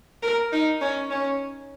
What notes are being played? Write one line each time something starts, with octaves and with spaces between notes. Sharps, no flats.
A#4
D#4
C#4
C#4